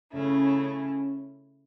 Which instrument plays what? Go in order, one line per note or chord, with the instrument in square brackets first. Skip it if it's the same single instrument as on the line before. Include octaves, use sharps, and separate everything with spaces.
[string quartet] C#3 A3 E4 [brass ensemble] C#4
[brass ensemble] C#4